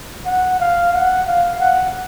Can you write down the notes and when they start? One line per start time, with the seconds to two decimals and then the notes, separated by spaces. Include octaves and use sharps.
0.26 F#5
0.60 F5
0.93 F#5
1.27 F5
1.60 F#5